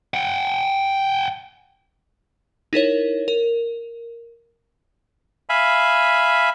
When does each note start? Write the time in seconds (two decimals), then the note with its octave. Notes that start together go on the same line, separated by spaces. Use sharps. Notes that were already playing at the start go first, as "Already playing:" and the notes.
0.14 F#5 G5
2.73 D#4 E4 A#4 C#5
3.28 A#4
5.49 E5 F5 G#5 B5